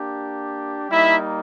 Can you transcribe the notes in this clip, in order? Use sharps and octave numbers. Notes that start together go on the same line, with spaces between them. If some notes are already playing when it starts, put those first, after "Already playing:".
Already playing: A#3 D4 G4
G3 A#3 D#4 E4 E5